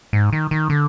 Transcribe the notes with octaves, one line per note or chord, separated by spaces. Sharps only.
G#2
D#3
D#3
D3